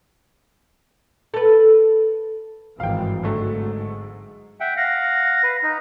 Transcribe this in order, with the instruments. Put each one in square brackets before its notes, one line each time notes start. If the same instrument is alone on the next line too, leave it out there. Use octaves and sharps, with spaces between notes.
[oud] A4 B4
[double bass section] G#1 G2 E3 [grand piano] F5 G5
[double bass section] G#2 [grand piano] D3 F#3 A3
[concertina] E5 F#5 G5
[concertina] F5 F#5 [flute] A#6
[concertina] B4
D#4